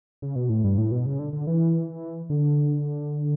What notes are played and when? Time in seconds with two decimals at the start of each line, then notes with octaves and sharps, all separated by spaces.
0.22 C#3
0.36 B2
0.49 A2
0.64 G2
0.78 A2
0.92 B2
1.06 C#3
1.19 D3
1.33 D3
1.47 E3
2.30 D3